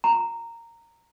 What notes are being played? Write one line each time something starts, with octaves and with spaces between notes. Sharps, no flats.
A#5